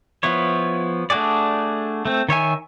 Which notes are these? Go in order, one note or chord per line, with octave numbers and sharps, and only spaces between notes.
F3 B3 E4 C#5
A3 D4 F#4 G#4 D5
A3 C4
D#3 C#5 E5 G#5